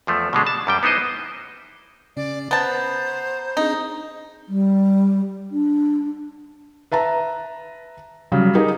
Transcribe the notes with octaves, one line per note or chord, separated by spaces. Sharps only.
E2 F3 A3
B2 D3 G#3 A3
A5
F#2 G3 G5
B3 D#4 E4 C5 D#5
C#3 C#4 D5
B3 C5 A5 A#5
C4 D4 D#4 G#4
G3
D4
B4 E5 A5 A#5
C#3 F#3 G3
D#4 G4 G#4 A#4